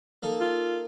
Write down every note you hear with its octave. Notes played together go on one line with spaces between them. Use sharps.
A#3 D#4 A4
F4